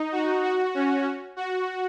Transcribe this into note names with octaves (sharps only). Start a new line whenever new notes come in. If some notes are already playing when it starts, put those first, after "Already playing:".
Already playing: D#4
F#4
F#4
C#4
F#4